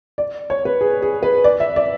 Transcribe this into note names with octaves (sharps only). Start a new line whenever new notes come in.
D5
C#5
B4
G#4
G#4
B4
D5
E5
D5